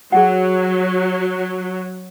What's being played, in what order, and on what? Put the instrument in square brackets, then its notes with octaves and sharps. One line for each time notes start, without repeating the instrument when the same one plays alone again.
[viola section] F#3 [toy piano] G#4 F#5